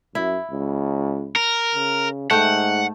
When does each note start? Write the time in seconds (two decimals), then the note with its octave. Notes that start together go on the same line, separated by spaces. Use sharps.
0.15 F#2 E4
0.51 C#2
1.36 A#4
1.75 C#3
2.31 G#2 A3 F#5 G5